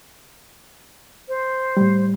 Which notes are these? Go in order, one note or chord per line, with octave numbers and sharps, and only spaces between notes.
C5
A2 G3